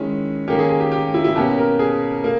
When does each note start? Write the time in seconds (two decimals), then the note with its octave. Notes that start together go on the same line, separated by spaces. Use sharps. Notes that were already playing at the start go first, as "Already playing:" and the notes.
Already playing: D#3 G#3 C#4 E4
0.48 D#3 A#3 C#4 G4
0.59 G#4
0.69 G#4
0.80 G4
0.92 G4
1.14 E4
1.24 E4
1.36 B2 A#3 C#4 G4
1.58 A#4
1.79 G#4
2.24 A#3